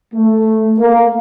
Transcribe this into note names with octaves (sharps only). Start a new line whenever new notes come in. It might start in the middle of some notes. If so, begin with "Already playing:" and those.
A3
A#3